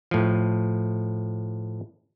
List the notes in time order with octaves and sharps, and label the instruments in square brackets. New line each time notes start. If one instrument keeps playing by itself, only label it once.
[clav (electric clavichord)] A2 F3